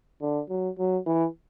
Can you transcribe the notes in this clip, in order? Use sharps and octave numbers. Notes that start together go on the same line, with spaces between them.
D3
F#3
F#3
E3